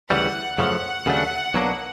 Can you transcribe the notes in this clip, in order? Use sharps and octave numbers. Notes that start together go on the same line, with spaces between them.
D2 C#3 E3 G3 F#5
F#2 C#3 F3 A3 F#5
D#2 C#3 F#3 A3 D4
B1 B2 F#3 A#3 D4